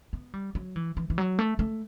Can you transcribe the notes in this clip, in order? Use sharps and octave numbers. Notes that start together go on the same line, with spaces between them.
B3
G3
F#3
E3
E3
E3
F#3
A3
A3